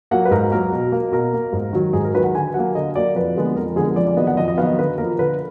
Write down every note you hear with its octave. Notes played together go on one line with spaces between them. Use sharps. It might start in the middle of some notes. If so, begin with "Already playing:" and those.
F#3 A#3 F#5
B4
G#2 A#4
F#3 A#3 A#4
B2
A#3
B2 A#4
A#3
G#2
D#3 F#3
G#2 G#4
A#4
D#3 F#3 B4
F#5
D3 G#5
F#3 A#3 F#5
D3 D#5
F#3 A#3 D5
F2 B4
D3 F3 G#3 B3
F2 A#4
A#4
D3 F3 G#3 B3 G#4
A#4
F2 D5
D5
D#3 F#3 B3 D#5
F#5
F2 D#5
D#5
D#3 F#3 B3 F5
D#5
D3 B4
F3 A#3 A#4
D3 B4